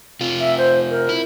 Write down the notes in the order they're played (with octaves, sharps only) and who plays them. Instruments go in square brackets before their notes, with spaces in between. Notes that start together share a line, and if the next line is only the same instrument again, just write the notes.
[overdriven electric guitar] C3 F4
[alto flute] E5
C5
A#4
[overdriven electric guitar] E4